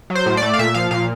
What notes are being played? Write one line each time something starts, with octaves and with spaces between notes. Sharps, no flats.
F#3
C5
A2
A3 D5
F5
A#2 E5
F3 F5
A#2 F5